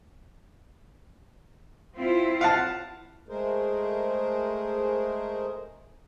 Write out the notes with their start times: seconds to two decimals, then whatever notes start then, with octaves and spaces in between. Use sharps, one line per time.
1.96 C4 E4 F4
2.41 F5 F#5 A5
3.29 G#3 A3 G#4 A#4 C5